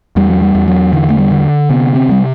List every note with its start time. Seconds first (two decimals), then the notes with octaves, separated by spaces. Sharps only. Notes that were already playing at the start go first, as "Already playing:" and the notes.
0.16 E2 G3
0.30 F#3
0.42 G3
0.55 E2
0.68 F#3
0.93 D3 E3
1.10 A3
1.18 G3
1.31 D3
1.70 C3 B3
1.95 C4
2.08 D2
2.11 G3